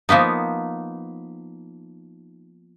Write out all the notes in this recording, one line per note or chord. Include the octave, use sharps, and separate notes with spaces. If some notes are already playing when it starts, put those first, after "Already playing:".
F3 A#3 B3 D#4